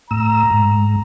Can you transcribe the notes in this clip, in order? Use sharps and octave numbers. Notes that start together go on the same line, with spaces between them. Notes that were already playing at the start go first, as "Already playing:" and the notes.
A2 A#5 E6
G#2